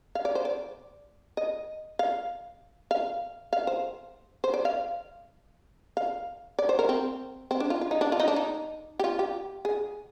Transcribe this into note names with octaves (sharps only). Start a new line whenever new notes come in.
F5
D5
C5
D5
D#5
F5
F5
F5
C5
C5
D5
F5
F5
D5
C5
A#4
C4
C4
D4
F4
F4
D#4
D4
F4
D#4
D4
D#4
G4
F4
G4
G#4